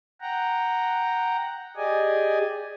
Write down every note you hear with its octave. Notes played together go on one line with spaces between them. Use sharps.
F#5 G5 A#5
G4 G#4 D5 D#5 G#5